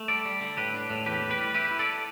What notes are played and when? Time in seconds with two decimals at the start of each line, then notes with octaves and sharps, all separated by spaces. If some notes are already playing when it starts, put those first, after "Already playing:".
Already playing: A3
0.08 G3 A4 D5
0.26 G3
0.41 D3
0.57 A2 G4 B4
0.74 D4
0.90 A2
1.06 E2 G4 B4
1.22 E2
1.30 G4 B4
1.38 G3
1.54 E4 G4 B4
1.71 E4
1.79 A4 D5